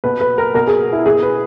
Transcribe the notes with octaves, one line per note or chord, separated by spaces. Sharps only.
B2 B4
B4
A#4
B2 A#4
G#4
E4
B2 G#4
B4